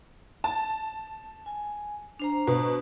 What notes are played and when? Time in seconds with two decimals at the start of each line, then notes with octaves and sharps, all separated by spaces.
0.44 A5
1.46 G#5
2.20 D4 C5 A#5
2.47 B2